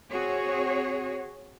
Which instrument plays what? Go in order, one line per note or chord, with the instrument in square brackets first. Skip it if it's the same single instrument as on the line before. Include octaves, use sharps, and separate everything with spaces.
[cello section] C4 F#4 G#4 C#5